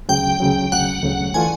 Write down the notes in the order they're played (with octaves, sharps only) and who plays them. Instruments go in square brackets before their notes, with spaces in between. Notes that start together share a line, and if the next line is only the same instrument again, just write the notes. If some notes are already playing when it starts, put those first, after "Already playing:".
[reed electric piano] D2 C#3 F#3 [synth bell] G5
[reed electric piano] D2 C#3 F#3
[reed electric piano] D2 C#3 F#3 [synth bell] F#5
[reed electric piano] D2 C#3 F#3
[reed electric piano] E3 A3 D4 F4 [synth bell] G#5